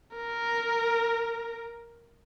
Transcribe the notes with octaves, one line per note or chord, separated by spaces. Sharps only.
A#4